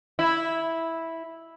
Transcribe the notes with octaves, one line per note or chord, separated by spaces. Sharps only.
E4